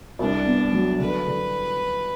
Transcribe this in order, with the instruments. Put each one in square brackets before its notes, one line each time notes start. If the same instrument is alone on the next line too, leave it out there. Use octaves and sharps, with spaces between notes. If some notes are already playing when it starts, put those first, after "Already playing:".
[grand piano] C2 [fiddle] D4
[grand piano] B3
F#3
[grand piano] D3 [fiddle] B4
[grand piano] D3